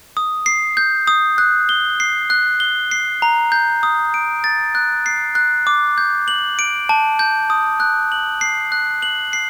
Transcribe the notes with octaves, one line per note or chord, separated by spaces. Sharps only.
D#6
C7
G6
D#6
F#6
G7
C7
F#6
G7
C7
A#5
G6
D#6
D7
A6
F#6
C7
F#6
D6
G6
F#7
D7
A5
G6
D#6
F#6
F#7
C7
F#6
F#7
C7